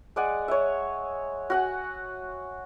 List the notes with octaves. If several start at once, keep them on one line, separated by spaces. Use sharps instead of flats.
G#3 D5 F#5 G#5
C#5 E5
F#4 F#5 G#5